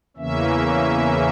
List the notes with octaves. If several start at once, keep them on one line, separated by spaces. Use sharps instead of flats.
E2 C#3 E3 A#3 C#4 E5